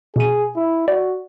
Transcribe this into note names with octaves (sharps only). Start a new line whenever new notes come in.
B2 G#4 D#7
E4
F#4 D5